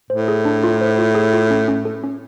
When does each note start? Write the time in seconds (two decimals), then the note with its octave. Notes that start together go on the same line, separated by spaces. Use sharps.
0.10 A2 C5
0.28 G#4
0.45 D4
0.64 F4
0.81 C5
0.99 F4
1.15 G#4
1.33 F4
1.50 C#4
1.68 C#4
1.85 A4
2.04 C#4